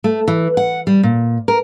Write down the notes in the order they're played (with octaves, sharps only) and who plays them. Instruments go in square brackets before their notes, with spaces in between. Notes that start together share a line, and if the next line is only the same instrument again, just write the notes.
[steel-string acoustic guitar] A3
E3
F#5
G3
A#2
A#4